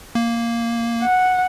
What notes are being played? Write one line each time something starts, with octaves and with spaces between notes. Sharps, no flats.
A#3
F#5